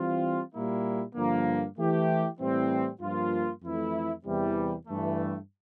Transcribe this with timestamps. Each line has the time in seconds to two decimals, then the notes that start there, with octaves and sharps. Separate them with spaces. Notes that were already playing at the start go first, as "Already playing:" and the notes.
Already playing: E3 G3 C4 F4
0.53 A#2 G3 A#3 E4
1.15 G2 D3 F3 A#3
1.78 E3 A3 E4 G4
2.39 A2 E3 G3 C4
3.01 G2 F3 A#3 F4
3.63 F2 E3 A3 E4
4.25 E2 C3 E3 G3
4.87 G2 E3 A3